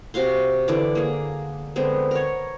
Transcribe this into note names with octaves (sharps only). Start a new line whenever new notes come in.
C3 F#4 F5 C6
D3 E3 D5
A#3 G#4
D3 G#3 B3 C4
A#4 C#5